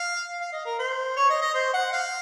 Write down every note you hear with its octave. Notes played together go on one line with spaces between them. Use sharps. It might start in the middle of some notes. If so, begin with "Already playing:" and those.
Already playing: F5
F5
D#5
A#4
C5
C#5
D#5
D#5
C5
F#5
F5